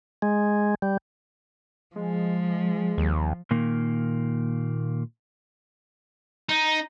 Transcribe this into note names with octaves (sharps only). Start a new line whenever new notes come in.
G#3
G3
F3 G#3
D#2
A#2 D#3 A#3
D#4